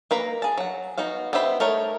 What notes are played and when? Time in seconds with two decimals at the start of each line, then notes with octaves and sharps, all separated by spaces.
0.11 A#3 B4 A#5 B5
0.42 G#4 A5
0.57 F#3 F#5
0.97 B3 D#4 F#4 F5
1.33 B3 G4 C5 E5 B5
1.60 A3 D#4 A#4 C#5